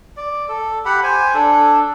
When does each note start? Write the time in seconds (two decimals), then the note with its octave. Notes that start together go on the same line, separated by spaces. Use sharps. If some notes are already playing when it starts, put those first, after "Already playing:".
0.17 D5
0.49 A4
0.85 G4 F#5 B5
1.03 C5 G#5
1.34 D4 A4